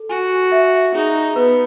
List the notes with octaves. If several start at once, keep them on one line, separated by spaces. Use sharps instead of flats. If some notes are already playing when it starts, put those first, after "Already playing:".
Already playing: A4
F#4 G#5
E5
D#4 G#4
B3 B4